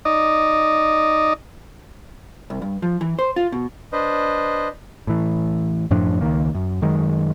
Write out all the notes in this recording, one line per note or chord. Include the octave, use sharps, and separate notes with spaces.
D#4 D5 D#5
C2
G2
F3
E3
C5
F4
B2
D4 B4 C5 D#5
A2 E3
F#2 A2 F3 D4
C#2 F#2 D#3 A#3
F#2
F#2 D#3 G#3